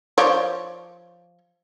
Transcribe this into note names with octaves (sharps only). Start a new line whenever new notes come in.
F3 C#5 D5